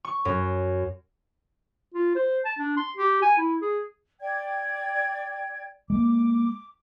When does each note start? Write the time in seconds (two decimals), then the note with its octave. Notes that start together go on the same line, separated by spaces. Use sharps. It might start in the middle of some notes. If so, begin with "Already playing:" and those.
0.05 C#6
0.25 F#2
1.94 F4
2.16 C5
2.45 A5
2.59 D4
2.77 C6
2.97 G4
3.22 G#5
3.37 E4
3.62 G#4
4.21 D5 G5 G#6
5.90 G#3 A#3 D6